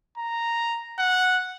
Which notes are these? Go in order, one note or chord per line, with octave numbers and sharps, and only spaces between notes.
A#5
F#5